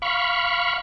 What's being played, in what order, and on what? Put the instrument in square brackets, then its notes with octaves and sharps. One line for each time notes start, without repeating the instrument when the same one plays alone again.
[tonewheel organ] F5 B5 C#6